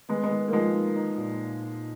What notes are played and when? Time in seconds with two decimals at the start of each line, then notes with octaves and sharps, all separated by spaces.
0.09 D#3 G#3 B3
0.23 G#3 B3
0.31 D#3
0.48 A#3
0.52 D#3 F3 G#3
0.74 D#4
0.96 D#4
1.18 A#2